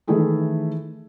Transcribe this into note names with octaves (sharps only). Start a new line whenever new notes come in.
D#3 E3 A3 E4 G#4 A4